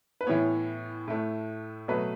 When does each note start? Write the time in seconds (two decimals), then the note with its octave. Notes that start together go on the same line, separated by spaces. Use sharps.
0.21 B4
0.27 A2 E3 B3 C#5
1.08 A2 A3
1.88 B2 F#3 A3 B4